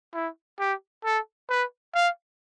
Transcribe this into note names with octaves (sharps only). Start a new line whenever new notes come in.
E4
G4
A4
B4
F5